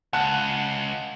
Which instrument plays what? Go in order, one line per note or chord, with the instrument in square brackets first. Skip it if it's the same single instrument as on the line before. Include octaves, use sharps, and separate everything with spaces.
[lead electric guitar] C#2 [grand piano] F#5 A5 F#6